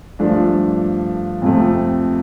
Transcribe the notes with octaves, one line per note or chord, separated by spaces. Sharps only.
G2 F3 A3 D4
F2 C3 F3 A3